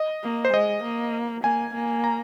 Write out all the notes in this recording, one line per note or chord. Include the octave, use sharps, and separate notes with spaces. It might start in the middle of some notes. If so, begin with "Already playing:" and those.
Already playing: D#5
A#3
C5
G#3 D#5
A#3
A#3 G#5
A#3
A#5